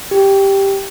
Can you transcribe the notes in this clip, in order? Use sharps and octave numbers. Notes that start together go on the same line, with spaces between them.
G4